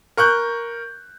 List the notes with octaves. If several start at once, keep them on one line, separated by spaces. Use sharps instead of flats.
A#4 C#6 F#6 G6